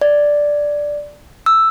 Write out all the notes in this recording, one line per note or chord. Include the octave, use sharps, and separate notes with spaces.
D5
E6